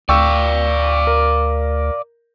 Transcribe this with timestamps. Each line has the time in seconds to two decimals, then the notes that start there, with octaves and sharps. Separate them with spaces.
0.09 D2 D5 F5 G5 C#6 E6
1.07 A#4